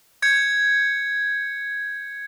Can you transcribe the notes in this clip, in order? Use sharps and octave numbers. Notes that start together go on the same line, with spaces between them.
G6 G#6 C#7